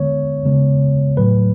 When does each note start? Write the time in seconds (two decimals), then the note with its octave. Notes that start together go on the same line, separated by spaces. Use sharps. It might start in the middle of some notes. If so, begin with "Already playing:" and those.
Already playing: D3 G#3 B3 C#5
0.45 C#3 G#3 B3
1.17 A2 F#3 A3 B4